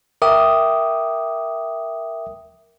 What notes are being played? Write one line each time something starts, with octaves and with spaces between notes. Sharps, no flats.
A#4 E5 G5 D6 D#6